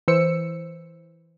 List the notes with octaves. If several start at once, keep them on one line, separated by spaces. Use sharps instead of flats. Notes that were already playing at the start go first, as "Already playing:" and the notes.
E3 C5 E6 C#7